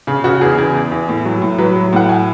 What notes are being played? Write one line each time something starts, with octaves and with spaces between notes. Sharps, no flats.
C#3 G#4
C#3 F#4
E2 G#4
E2
E2
E2
A2
F#3
A2
F#3 B4
F#3
A2 F#5
G#5